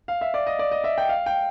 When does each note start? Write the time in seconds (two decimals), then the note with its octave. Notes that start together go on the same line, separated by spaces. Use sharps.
0.08 F5
0.21 E5
0.34 D5
0.47 D#5
0.59 D5
0.71 D#5
0.84 E5
0.98 G5
1.09 F5
1.26 G5